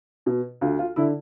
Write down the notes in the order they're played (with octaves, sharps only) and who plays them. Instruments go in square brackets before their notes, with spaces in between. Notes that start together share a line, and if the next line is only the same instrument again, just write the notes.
[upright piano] B2
D2 F4
F4
D3 E4